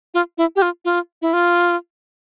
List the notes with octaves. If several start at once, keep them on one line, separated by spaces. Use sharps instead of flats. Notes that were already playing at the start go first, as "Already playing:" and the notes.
F4
E4
G4
F4
F4
E4
F4